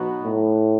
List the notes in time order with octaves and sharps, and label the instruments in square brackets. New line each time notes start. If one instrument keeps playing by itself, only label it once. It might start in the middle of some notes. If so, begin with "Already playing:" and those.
Already playing: [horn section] B2 F#3 B3 D#4 F#4
[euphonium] A2